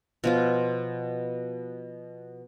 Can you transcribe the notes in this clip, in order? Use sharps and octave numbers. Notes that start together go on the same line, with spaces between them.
B2 F3 F4